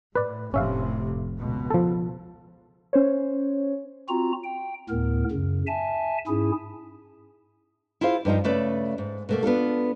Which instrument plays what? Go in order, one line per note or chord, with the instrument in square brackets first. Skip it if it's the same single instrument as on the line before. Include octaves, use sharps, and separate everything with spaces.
[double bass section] A2 [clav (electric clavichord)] B4 D5
[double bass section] F1 A2 C3 [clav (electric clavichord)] C#4 E5 F5
[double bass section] C#2 B2
[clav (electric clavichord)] F3 A4
[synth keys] C#4 C5 C#5
[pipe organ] C4 F4 F#4 A#5
G5
D2 A2 B3 A#4
F#2 C#3
E5 G#5 A5
G#2 C#4 E4 G#4
[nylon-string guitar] E4 F4 G#4 C5 F5
G2 F3 D#4 F4
C#3 A3 B4 D5
G#2
B2 A3 A#3
B3 D4 F4 A4